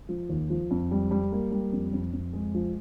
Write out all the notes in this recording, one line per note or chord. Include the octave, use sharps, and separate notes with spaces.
F3
D#2
F3
F2
G3
G3
A#3
G3
F2
F2
F2
G#3
F3